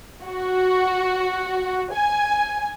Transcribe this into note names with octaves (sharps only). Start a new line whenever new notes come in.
F#4
G#5